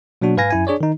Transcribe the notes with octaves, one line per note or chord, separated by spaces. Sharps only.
B2 F#3 A#3 D4 F#4
G#2 B4 F5 G#5 A#6
F#2 E4 G#5
D4 G#4 C#5 D5
D#3 D#4